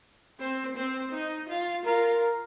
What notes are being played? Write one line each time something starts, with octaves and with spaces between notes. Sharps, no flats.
C4 C5
C4 C5
D#4 D#5
F4 F5
F4 A#4 F5